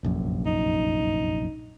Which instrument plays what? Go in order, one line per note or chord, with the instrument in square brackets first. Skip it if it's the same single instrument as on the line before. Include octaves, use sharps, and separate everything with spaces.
[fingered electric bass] F1 A#1 F#2
[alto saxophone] D#4